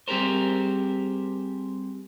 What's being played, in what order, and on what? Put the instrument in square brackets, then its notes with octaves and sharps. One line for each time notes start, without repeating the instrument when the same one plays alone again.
[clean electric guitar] G3 C4 G4 G#4 A#4 C5